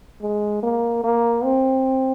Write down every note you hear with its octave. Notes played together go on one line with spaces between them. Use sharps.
G#3
A#3
A#3
C4